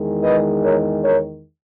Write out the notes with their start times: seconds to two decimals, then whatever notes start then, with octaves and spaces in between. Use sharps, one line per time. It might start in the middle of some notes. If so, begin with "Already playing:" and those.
Already playing: E2 D#3 G#3
0.23 B4 D#5
0.64 A#4 C#5
1.04 A#4 C#5